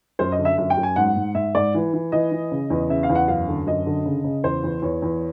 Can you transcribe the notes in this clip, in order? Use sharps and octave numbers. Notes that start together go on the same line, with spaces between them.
F#2 C5
D#5
D3
E5
F#2 E5
G5
F#2
G#5
G#2 F#5
G#2
G#2 E5
G#2 D5
E3
E3
E3 D#5
E3
C#3
E2
C#3 E5
F5
E2
F#5
F#2 F5
D3
F#2 D#5
D3
C#3
C#3
E2 C5
E2
E2 C#5
E2